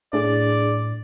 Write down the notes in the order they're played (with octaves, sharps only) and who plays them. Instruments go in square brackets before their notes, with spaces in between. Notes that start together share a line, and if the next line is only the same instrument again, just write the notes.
[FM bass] A2 [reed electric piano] D4 G#4 [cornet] D5